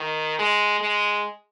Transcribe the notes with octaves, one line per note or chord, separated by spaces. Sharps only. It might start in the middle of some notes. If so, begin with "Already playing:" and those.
Already playing: D#3
G#3
G#3